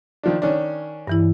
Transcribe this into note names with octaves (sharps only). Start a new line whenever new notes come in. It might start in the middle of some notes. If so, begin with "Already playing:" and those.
D#3 F3 D4
D#3 C#4 D4
G2 E3 E4